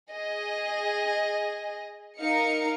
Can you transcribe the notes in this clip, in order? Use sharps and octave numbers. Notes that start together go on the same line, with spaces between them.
G#4 D#5
D#4 A#4 F5 C#7